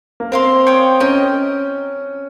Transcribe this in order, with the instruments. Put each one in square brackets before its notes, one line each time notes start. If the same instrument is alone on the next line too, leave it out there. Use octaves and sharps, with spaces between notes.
[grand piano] A#3
[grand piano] C4 [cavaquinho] A#4 F5 C6
[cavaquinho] C#5 G5 C6 D#6
[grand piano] C#4 [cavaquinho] A#4 D#5 G5